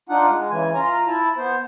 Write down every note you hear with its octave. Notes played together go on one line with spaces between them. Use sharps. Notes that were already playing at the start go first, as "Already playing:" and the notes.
D4 D#4 F4 F#5
G#3
C#3 E3 G#5
F4 A#5
E4 A5
B3 C5